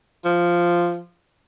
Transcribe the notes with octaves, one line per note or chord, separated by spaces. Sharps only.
F3